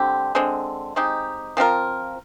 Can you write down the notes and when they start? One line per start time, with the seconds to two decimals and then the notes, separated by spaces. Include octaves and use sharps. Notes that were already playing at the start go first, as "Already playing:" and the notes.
Already playing: D3 G3 C4 G4
0.35 D3 G#3 C4
0.96 G#3 C4 D#4 G4
1.57 F3 C4 F4 A#4